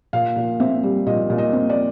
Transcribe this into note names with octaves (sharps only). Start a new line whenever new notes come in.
A#2 F5
A#2
C4 E5
G3
A#2 D#5
A#2
D#5
C4
D5